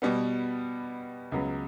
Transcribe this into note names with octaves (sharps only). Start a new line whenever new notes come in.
B2 G3 B3
C#2 C#3 F#3 B3